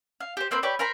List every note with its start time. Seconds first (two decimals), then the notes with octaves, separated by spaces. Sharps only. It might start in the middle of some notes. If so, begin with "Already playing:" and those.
0.20 F5
0.37 G4 C5
0.51 A#3 C4 B4 C5
0.63 G4 B4 C#5 D5
0.79 A#4 C5 A#5 B5